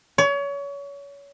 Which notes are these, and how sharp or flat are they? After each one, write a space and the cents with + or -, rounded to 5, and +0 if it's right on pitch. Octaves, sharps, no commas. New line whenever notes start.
C#5 +30